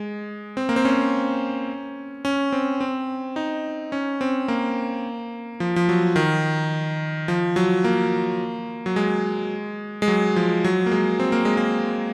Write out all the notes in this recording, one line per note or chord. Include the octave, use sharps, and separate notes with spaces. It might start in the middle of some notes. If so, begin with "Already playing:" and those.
Already playing: G#3
C4
A#3
C4
C#4
C#4
C4
C4
D#4
C#4
C4
A#3
F3
F3
F#3
D#3
F3
F#3
A#3
F#3
G#3
G#3
F#3
F3
F#3
A#3
G#3
C4
A#3
G#3
A#3